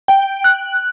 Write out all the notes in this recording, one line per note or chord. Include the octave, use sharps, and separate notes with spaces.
G5
F#6